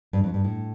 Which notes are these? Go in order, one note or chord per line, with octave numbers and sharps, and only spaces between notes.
G2
F2
G2
A2